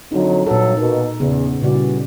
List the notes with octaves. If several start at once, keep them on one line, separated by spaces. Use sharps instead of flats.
F2 D3 F#3 D#4
G2 A#2 F#3 A4
B2 A#3 D#4
E2 C#3 B3
A#2 C#3 E3 G3 F#4 D5